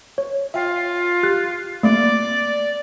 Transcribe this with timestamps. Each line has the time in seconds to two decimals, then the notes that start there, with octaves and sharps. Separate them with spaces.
0.18 C#5
0.54 F4 E5 G5
1.23 G4 F#6
1.83 A3 A#3 C4 D5